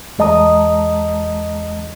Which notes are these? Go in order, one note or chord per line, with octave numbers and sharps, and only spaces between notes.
E2 G#3 D#5 A5 A#5 D#6